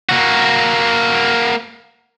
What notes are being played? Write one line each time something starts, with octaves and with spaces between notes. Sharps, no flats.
A#3 F#4